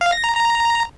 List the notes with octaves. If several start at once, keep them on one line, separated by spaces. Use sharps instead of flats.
F5
A#6
A#5
A#5